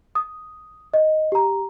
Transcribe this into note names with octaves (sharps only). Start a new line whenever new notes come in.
D#6
D#5
G4 A#5